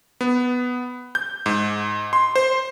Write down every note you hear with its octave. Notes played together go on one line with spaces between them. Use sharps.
B3
G6
G#2
C6
C5